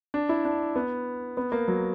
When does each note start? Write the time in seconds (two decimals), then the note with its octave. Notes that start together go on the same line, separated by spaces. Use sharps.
0.14 D4
0.29 E4
0.45 D4
0.76 B3
1.37 B3
1.52 A#3
1.68 F#3